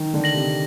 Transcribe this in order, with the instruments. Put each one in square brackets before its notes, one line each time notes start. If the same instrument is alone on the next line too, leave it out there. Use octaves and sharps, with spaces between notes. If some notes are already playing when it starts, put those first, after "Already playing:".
Already playing: [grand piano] D#3
D3
[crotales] A#6 F#7
[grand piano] C3